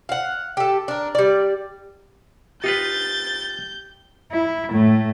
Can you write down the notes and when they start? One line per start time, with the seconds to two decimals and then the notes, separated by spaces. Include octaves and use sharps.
0.09 F5 F#5
0.57 G4 A4
0.88 D4 A#4
1.15 G3 D5
2.64 D#4 F4 G4 B4 G6 A6
4.32 E4
4.71 A2 A3